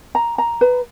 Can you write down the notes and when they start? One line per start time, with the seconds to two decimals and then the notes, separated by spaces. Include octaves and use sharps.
0.15 A#5
0.38 A#5
0.61 B4